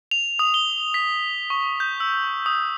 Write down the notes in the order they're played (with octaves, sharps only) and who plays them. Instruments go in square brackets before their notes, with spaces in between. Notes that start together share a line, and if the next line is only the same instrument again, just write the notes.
[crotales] F7
D#6
G7
B6
C#6
G6
E6
D#6